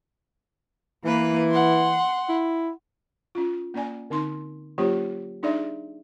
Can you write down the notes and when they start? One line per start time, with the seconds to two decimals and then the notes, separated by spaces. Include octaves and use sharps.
1.05 E3 A#3 B4
1.51 F#5 C6
2.29 E4
3.35 C#4 F4
3.74 A#3 C#4 D5 G#5
4.10 D3 C4 D#4 C6
4.78 F#3 A#3 C#4 F4 G4 C5
5.43 D4 D#4 G#4 D5 E5